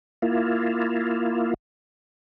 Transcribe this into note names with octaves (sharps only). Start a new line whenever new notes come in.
A#3 E4 F4